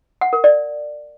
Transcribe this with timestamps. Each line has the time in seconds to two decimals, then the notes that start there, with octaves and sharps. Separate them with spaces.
0.21 F#5
0.33 A#4
0.44 D5